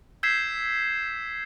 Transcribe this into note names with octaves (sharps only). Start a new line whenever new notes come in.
E6 G6 G#6 B6 C7 E7